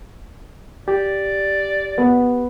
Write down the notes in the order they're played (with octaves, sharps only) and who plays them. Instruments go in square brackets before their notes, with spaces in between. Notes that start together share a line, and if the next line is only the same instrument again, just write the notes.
[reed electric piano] G4 [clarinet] D5
[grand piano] B3